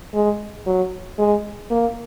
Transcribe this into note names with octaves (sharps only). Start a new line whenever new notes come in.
G#3
F#3
G#3
A#3